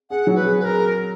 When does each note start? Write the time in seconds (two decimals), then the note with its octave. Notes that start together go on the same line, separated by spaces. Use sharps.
0.10 G#4 F#5
0.27 F#3
0.35 B4
0.43 G#4
0.59 G#4 B4
0.64 A#4